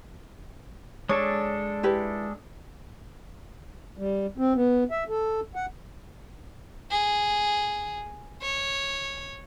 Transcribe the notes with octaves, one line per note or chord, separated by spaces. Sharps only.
G#3 D4 A4 C#5
E4 G4 B4
G3
C4
B3
E5
A4
F#5
G#4
C#5